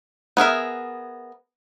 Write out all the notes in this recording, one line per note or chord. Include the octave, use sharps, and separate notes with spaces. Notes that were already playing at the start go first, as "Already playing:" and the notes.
B3 G#4 A#4 E5